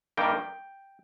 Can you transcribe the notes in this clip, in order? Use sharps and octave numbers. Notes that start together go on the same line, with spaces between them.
G2 D#3 G3 A#3 G5